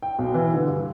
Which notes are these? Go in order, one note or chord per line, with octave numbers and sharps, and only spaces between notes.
G5
B1
E3
D3
G2